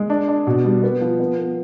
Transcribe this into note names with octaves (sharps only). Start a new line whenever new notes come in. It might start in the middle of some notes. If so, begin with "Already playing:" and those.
Already playing: G#3
D4
D4
B2
G3
B3
F3
B3
B3